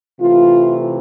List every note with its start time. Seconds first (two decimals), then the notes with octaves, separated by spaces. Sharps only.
0.19 C3 E3 A3 F4